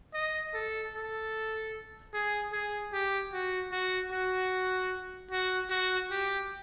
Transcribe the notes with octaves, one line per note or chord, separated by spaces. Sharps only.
D#5
A4
A4
G#4
G#4
G4
F#4
F#4
F#4
F#4
F#4
G4